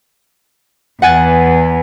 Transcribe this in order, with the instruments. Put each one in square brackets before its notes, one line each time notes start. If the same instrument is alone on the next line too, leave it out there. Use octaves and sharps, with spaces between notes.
[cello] E2 [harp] F#5 G#5 A6